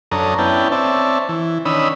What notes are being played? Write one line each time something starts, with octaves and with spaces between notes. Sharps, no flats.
F#2 D4 A4 C#5 A#5 D#6
B3 C#4 D4 E4 G5 A5
C4 C#5 D5 E5 A5
E3
D#3 C#4 D4 B5 D#6 E6